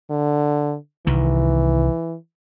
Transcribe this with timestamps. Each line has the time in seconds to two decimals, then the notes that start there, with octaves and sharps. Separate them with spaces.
0.10 D3
1.07 C2 D#3 E3